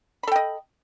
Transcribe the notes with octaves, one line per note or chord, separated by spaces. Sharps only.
A4 D#5 G5 B5